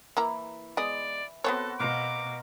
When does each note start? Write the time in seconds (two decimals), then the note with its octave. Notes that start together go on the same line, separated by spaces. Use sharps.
0.17 E3 A#3 E4 A#5
0.77 G#3 B3 D5 D#5
1.44 B3 C4 F#4 A4 B4 C#5
1.79 B2 C5 F5 A#5 D6